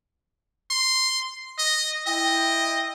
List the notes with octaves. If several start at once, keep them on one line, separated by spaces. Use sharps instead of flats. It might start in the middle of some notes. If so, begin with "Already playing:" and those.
C6
D#5
E4 D#5 G5